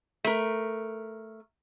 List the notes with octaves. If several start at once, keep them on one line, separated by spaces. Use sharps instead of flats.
A3 A#4